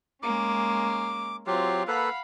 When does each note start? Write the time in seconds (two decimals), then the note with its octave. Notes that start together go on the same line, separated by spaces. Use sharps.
0.23 G#3 A#3 C#4 D6
1.47 F#3 C4 F4 G4
1.88 A#3 A4 B4 F5 F#5 B5